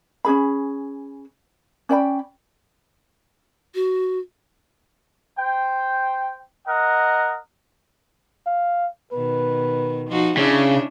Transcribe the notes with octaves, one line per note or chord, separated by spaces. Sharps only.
C#4 D#4 G#4 B5
C#4 D5 G5 B5
F#4
C5 G5
A#4 D#5 F#5
F5
B2 D#3 B4
F3 D#4 F#4
C#3 C#4 D4 E4